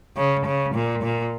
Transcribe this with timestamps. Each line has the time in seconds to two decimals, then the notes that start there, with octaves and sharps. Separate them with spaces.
0.16 C#3
0.46 C#3
0.75 A#2
1.03 A#2